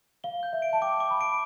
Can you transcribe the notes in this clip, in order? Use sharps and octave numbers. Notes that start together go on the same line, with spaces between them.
F5 G7
G6
E5
D7
A5
G5 D6
D6
B5
D7